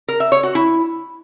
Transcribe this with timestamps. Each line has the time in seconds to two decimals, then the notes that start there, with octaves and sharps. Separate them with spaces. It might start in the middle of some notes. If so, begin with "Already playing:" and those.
0.08 A#4
0.20 E5
0.32 C#5
0.43 F#4
0.55 E4